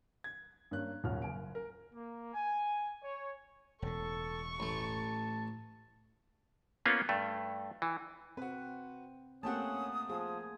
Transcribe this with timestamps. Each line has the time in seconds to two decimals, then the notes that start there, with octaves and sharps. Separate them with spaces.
0.24 G#6
0.71 G2 A#3 C#4 F#6
1.04 D#1 A#2 C#3 F#3 F6
1.22 F#1 G#5 D7
1.55 A#4
1.93 A#3
2.34 G#5
3.03 C#5
3.82 E1 A2 A4 C#6
4.60 A1 A3 A5
6.86 A#3 B3 C#4 F4
7.09 G2 A3
7.82 E3
8.37 C4 F#4 B4
9.43 A3 A#3 C4 C#4 G4 F#5 A5 D#6
10.10 F3 G#4